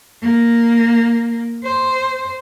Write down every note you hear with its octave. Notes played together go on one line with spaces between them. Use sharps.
A#3
C5